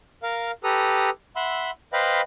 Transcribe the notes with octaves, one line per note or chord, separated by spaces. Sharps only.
A#4 F5
G4 A4 B4 A#5 D#6
E5 F#5 B5 C6 E6
B4 C5 D#5 F5 G5 B5